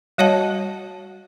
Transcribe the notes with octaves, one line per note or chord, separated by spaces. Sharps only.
G3 F#4 C#5 D#5 F#5 A5